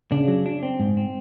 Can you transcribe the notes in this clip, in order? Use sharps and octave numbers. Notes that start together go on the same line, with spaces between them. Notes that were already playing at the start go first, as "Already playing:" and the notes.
C#3 D4
F#3
D4
C4
G#2
C4